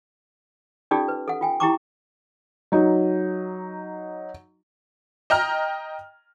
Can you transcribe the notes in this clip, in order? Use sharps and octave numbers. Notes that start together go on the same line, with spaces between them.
C#4 D#4 F4 G4 A4 D5
B4
A4 F#5
F4 G5 G#5
E4 G4 G5 A#5 C#6 D6
F#3 D#4
D#5 G5 A#5 F6